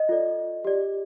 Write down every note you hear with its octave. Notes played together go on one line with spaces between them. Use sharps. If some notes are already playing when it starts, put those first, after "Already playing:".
Already playing: D#5
F4 A4 D5
G4 D5